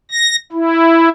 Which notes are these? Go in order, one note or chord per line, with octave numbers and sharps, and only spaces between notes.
A#6
E4